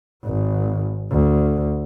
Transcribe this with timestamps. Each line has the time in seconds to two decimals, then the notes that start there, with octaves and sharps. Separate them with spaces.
0.24 G#1
1.11 D2